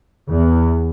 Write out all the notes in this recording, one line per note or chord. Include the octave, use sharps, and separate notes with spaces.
E2